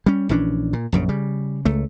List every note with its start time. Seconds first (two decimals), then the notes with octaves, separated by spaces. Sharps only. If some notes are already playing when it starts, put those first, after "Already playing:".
0.06 G3 C#4
0.29 A#1 E3 C#4 D4
0.73 A#2
0.92 A#1 F#2 C#3
1.09 C#3 G3
1.65 C#2 A3